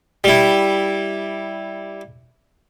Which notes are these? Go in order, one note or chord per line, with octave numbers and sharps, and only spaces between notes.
G3 E4